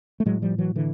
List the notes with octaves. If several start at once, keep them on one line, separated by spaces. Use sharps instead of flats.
A3
A2 F#3 G#3
F3 G3
E3 F#3
D3 E3